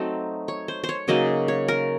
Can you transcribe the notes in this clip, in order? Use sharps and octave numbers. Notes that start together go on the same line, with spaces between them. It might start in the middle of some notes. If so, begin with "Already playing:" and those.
Already playing: F#3 A3 C4 D#4
C#5
C5
C5
C#5
C#3 F#3 A#3 D#4 D#5
C#5
A#4